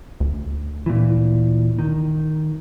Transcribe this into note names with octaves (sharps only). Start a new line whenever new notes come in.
D2
A#2 E3
D#3